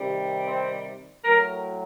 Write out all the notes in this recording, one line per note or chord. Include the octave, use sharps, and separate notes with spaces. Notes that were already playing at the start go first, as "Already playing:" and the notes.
Already playing: C3 D#3 G3
C4
A2 F#3 A#4